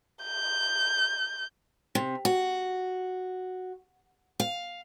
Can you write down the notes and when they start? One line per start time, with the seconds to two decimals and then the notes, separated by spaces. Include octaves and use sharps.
0.24 G6
1.95 C3
2.25 F#4
4.40 F5